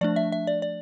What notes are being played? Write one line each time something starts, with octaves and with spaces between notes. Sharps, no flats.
F3 A3 D4 D5
E5
E5
D5
D5